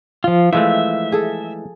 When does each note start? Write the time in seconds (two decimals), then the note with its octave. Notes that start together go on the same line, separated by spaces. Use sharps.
0.24 F3 F4
0.53 E3 F3 G#3 A3 E5
1.12 G#4 A4